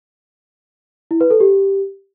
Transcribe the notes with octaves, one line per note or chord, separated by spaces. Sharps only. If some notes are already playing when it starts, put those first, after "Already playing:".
E4
B4
A4
G4